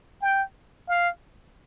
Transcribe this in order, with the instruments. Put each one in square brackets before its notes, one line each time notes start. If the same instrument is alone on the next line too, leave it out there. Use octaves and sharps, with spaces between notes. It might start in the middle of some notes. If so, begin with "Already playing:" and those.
[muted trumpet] G5
F5